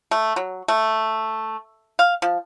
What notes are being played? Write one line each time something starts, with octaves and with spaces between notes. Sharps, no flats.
A3
F#3
A3
F5
F3